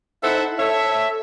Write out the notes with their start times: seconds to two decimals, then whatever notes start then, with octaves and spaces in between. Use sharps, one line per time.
0.23 D#4 E4 A4 C5 E5 F#5
0.59 A4 C#5 E5